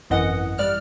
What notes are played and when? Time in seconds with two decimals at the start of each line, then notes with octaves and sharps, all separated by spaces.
0.10 G#1 F#2 E3 D#5 F#5
0.58 G3 D5 F6 F#6